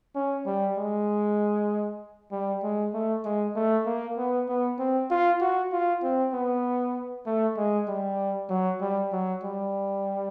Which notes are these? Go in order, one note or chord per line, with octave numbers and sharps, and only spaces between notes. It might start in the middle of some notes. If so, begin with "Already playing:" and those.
C#4
G3
G#3
G3
G#3
A3
G#3
A3
A#3
B3
B3
C4
F4
F#4
F4
C4
B3
A3
G#3
G3
F#3
G3
F#3
G3